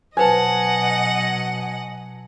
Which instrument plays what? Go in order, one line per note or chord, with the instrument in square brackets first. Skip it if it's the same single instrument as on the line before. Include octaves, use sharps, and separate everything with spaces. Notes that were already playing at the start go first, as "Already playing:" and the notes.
[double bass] B2 F#3 [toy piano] B4 C5 [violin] D#5 F#5 [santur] G#5 A5